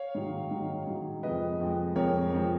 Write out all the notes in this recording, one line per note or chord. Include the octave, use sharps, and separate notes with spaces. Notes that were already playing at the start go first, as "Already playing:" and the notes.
Already playing: C#5 F5
G#2 D#3 F#3
G#2 D#3 F#3
G#2 D#3 F#3
F2 F3 G#3 B4 D#5
F2 F3 G#3
F2 F3 G#3 A#4 C#5
F2 F3 G#3